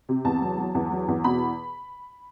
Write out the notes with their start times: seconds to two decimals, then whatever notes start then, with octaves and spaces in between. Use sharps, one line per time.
0.09 C3
0.25 E2 A5
0.42 F#3
0.58 F#3
0.75 E2
0.91 F#3
1.08 E2
1.24 B2 B5